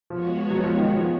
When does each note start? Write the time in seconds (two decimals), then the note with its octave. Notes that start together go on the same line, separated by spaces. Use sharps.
0.10 F3 G#3 B3 F#4 C#5
0.51 F#3
0.64 F3
0.77 D#3
0.91 F3